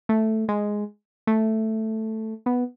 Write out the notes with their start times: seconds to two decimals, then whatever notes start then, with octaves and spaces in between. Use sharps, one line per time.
0.09 A3
0.49 G#3
1.27 A3
2.46 B3